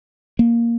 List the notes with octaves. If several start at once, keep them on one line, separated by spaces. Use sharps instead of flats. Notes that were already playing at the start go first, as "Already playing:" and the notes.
A#3